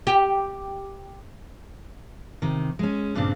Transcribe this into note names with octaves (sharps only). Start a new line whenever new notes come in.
G4
C3 D#3
G#3 C#4
G2 A#2 C#3 C4 D4